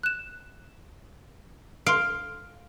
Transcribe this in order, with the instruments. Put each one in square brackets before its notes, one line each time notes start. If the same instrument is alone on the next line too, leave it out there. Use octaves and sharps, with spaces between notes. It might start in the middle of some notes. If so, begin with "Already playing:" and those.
[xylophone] F#6 E7
[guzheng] F5 [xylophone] C6 D7